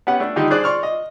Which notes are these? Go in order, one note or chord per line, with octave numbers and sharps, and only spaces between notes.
B3 C#4 G4 F#5
A3 D4
D3 D#3 G3 D#4
D4 G#4 C5 D5 F#6
D5 C6 C#6 F6
D#5